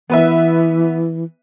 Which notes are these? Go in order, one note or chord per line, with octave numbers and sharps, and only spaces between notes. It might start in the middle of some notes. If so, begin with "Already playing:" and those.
E3 B3 B4 E5